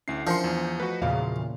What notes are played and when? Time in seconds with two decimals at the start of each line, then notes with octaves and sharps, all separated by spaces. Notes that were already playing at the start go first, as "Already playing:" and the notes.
0.08 D2 C#4 E4 E5 C7
0.27 F3 D4 A#4 C5 G#5 C6 G6 C#7
0.44 E2
0.80 A3 F#4 B4
1.02 E2 A#2 C#3 A#3 F#4 E5 F5